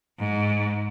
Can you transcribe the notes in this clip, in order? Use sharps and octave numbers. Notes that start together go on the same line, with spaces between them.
G#2